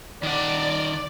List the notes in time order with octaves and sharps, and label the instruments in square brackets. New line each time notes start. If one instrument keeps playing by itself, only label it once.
[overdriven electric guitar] D#3 F#5 [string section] D5